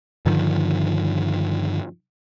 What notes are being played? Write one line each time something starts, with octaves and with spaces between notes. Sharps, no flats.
G2 D3 D#3 F3